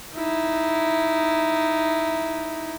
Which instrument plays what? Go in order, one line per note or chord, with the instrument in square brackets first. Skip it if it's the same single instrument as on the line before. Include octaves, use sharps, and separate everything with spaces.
[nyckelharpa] D#4 E4